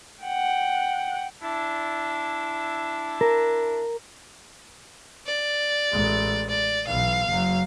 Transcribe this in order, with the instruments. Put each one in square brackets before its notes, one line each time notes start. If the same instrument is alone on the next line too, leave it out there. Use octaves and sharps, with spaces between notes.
[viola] F#5 G5
[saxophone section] D4 E4
[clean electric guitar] A#4
[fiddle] D5
[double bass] A1 G#3
[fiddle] D5
[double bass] B1 E3 [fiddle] F5
[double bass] F#1 F#3